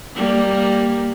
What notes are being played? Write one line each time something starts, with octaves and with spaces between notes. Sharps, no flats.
G3 A#3